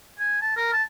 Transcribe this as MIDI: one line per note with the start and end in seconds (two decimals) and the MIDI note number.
0.19 0.40 80
0.42 0.55 81
0.57 0.71 70
0.73 0.83 81